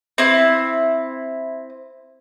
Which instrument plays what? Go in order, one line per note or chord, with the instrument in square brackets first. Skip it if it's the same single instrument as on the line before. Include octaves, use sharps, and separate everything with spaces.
[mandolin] C4 E4